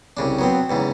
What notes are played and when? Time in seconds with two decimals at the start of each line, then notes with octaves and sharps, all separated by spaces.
0.17 C2 C#3 D4
0.39 F#3 B3 C4
0.70 E2 G#2 C#3